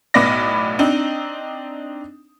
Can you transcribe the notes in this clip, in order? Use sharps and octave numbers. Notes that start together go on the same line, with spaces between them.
B1 A2 B3 D5 A#6
C4 D4 D#4